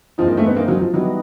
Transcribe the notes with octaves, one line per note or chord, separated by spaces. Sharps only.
G2 E3 F3 G#3 C4 D#4
A#3
A3
B3
A#3
F#3
F3
E3 F#3 G3 B3 D#4